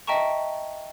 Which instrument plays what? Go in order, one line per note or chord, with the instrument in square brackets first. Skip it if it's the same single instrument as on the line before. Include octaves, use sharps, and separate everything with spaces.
[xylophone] D#5 E5 G5 A5 A#5 C#6